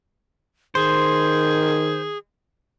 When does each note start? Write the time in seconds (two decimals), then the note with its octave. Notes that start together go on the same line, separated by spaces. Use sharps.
0.75 D#3 G#4 C5